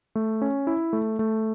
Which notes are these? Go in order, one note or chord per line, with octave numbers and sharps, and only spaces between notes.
A3
C#4
E4
A3
A3